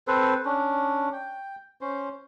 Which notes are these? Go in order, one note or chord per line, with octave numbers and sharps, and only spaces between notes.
C4 A4 B4 C5
C#4 D4
G5
C#4 C5